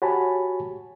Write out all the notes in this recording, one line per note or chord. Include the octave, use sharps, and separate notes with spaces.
F#4 G4 C#5 G#5 A5 B5